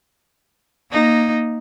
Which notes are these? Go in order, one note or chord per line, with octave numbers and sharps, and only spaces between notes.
A#3 D#4